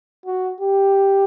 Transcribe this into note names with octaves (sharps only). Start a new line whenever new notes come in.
F#4
G4